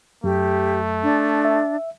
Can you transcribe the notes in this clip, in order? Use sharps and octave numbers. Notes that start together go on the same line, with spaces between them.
F#2 A3 G4
D4
E5